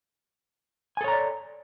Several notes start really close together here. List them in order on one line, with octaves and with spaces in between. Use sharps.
G#5 A4 C#5 A#5 D5